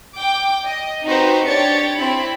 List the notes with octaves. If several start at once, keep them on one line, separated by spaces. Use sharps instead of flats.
G5 D6
D#5
C4 D#4 F#4 G4 B4 C5
D4 G4 C#5 A6 C#7
C4 E4 B5